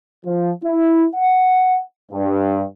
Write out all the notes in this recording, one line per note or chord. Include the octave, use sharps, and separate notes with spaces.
F3
E4
F#5
G2